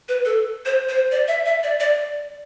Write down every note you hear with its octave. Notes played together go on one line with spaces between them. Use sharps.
B4
A4
C5
C5
D5
E5
E5
D5
D5